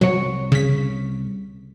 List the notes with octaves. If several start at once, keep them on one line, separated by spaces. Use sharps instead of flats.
C2 F#3 C#5
C#3 B6